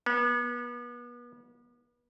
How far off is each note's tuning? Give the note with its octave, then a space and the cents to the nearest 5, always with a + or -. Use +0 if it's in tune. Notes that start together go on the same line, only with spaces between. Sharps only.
B3 -35